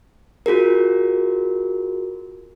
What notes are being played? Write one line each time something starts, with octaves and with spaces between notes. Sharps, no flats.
F4 F#4 G#4 A#4